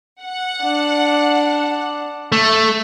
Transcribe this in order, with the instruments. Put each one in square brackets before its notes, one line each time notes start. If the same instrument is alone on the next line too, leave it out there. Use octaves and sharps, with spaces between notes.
[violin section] F#5
[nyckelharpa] D4
[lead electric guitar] A3